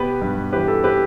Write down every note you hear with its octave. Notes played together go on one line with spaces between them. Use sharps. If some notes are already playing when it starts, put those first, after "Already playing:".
Already playing: B2 B3 G4 B4
G2
E3 G4 B4
A4
G4 B4